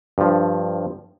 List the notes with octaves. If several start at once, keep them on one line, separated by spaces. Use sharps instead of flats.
G2 F3